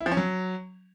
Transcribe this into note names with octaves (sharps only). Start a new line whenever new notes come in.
E4
F3
C#4
F#3